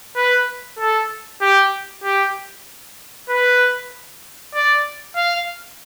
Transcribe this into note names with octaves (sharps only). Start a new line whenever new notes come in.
B4
A4
G4
G4
B4
D5
F5